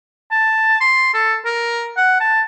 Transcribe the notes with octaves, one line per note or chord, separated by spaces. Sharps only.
A5
C6
A4
A#4
F#5
A5